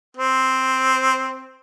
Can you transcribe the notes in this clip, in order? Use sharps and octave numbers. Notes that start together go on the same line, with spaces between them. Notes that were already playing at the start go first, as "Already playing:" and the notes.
C4